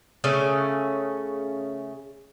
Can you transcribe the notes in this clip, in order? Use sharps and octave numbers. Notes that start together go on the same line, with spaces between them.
C#3 A3 C#4